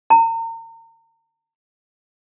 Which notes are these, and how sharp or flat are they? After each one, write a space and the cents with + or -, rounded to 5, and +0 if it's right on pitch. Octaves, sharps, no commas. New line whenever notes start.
A#5 -35